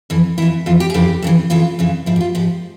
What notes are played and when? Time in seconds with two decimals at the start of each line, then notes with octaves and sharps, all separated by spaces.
0.10 F2 E3
0.38 F2 E3 E4
0.66 F2 E3 F4
0.80 G4
0.90 G#4
0.94 F2 C#3 E3 G4
1.22 F2 C#3 E3
1.50 F2 C#3 E3 F4
1.79 F2 C#3 E3
2.06 G#2 F3 E4
2.16 G4
2.21 F4
2.35 G#2 F3 G4